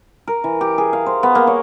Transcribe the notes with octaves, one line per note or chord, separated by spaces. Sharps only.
A#4
E3
G4
G#4
F5
C5
B3
A#3
C#5